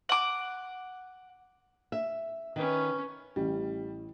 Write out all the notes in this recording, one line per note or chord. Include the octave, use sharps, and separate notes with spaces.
F#5 D6
E5
D#3 C#4 B4
A1 G3